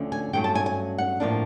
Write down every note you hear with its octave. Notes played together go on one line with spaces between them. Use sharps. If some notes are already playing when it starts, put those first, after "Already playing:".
Already playing: D2 D3 F3 A3 C#4
G#5
G2 D3 F#3 A3 C#4 G5
A5
G#5
G#5
F#5
A2 F3 A#3 D4